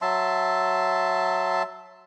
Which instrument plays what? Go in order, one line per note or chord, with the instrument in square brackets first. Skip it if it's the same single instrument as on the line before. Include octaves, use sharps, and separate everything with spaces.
[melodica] F#3 E5 A5 C6